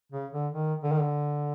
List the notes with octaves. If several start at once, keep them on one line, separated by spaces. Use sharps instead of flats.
C#3
D3
D#3
D3
D#3
D3